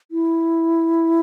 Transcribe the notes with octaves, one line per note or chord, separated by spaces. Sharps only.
E4